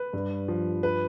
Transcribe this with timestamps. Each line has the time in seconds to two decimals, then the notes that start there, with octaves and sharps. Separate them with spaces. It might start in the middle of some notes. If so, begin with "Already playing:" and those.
Already playing: B4
0.13 G2
0.48 F3
0.83 B4